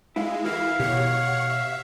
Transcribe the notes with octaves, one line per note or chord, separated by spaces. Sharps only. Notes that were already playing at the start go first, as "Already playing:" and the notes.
G#3 E4 B4 F5
E3 E4 F#4 A#4 F5
B2 G4 C#5 F#5
E5